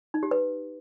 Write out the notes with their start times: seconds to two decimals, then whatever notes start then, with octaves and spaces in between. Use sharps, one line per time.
0.14 D#4
0.23 G4
0.31 B4